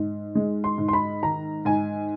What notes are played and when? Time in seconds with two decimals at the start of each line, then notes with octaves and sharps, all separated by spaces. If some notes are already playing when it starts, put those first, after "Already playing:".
Already playing: G#2
0.35 G#3
0.64 C6
0.78 G#2
0.88 C6
0.93 B5
1.23 D#3 A#5
1.65 G#2 G#5